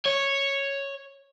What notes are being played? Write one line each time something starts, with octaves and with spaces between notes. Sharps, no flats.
C#5